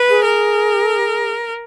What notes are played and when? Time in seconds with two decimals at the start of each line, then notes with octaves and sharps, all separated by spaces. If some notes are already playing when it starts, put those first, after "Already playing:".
Already playing: B4
0.09 G#4
0.24 A#4